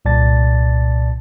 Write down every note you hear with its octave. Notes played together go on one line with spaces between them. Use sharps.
C2 A#2 D5 A5 A6